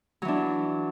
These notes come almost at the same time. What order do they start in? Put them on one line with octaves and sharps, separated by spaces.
F#3 E3 D4